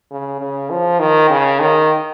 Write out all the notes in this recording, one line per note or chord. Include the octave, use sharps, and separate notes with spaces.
C#3
C#3
F3
D#3
C#3
D#3